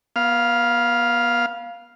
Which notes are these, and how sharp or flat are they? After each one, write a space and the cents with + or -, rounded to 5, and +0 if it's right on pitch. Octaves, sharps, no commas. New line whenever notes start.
B3 -30 F5 +0